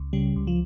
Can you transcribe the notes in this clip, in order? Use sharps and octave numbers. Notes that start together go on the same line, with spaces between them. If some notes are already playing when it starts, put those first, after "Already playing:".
Already playing: C#2
C#3 G3
C#2
F3